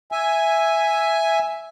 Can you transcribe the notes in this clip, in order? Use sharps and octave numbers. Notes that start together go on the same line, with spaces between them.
E5 G#5